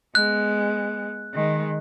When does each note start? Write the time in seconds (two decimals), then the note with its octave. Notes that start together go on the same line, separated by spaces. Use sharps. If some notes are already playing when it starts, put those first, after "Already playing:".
0.15 G#3 B3 F#6
1.34 D#3 G#3